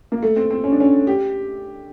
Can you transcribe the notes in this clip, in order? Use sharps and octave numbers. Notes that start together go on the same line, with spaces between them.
A#3
A3
C4
C4
C#4
D4
C#4
G4